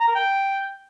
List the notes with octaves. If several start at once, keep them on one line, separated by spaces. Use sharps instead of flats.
A#5
A#4
G5